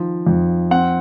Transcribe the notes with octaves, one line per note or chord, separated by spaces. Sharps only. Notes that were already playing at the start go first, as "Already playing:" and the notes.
Already playing: D#3 F3
F2
C4 F#5